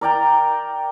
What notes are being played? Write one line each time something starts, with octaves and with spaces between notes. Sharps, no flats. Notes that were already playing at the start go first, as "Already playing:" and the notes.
A#4 D5 G5 A#5